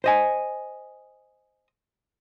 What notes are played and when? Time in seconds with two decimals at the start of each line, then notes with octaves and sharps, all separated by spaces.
0.04 C5 D#5 G#5